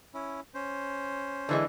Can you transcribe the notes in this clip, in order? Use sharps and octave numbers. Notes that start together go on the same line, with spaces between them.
C#4 E4
C#4 C5
D3 E3 G#3